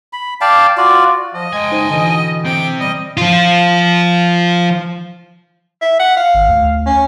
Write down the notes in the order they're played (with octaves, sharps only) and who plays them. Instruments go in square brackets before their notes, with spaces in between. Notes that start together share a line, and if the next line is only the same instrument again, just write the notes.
[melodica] B5
D5 F5 G5 A5
F4 F#4 D5
[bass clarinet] F3 [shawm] D#5
[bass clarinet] G#3 [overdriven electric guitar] G5 G#5
[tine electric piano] D#4 C5
[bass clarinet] B2 [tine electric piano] D3 E3
[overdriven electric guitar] C3 C4 [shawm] G5
[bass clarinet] G3 [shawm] D#5
[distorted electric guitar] F3 F4
[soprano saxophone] E5
F#5
F5
[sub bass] G#1
D2
[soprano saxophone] C#4